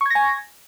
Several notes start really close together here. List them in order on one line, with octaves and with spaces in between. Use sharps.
C#6 G#6 A#6 G#5